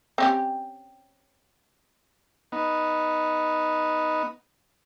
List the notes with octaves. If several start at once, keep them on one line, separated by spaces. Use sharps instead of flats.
C4 C#4 G4
B3 D#4